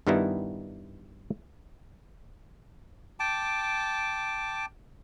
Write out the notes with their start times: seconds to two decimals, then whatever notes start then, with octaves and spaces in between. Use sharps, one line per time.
0.07 G2 D#3 G3 B3 D#4 E4
3.20 G5 A5 D6